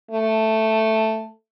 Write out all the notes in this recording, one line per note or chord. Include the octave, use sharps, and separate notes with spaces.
A3